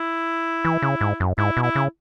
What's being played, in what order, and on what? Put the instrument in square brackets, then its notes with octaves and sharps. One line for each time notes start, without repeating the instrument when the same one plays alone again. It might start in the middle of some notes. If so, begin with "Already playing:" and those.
Already playing: [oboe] E4
[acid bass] E3
C#3
G#2
F#2
[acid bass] G#2 [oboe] E4
[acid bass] B2
[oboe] E4
[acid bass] C#3